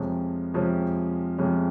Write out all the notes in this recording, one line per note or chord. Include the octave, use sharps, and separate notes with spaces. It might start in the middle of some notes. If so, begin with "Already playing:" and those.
Already playing: F2 C3 F3 G#3 C#4
F2 C3 F3 G#3 C#4
F2 C3 F3 G#3 C#4